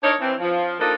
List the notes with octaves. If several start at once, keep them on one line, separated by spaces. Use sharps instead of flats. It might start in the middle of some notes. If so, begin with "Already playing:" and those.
D4 D#4 A#4 C#5
E3 C4
F3
A#3 D4 D#4 F4 A4